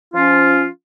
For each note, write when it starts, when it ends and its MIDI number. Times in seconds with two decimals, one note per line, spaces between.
0.14 0.67 53
0.14 0.67 61
0.14 0.67 65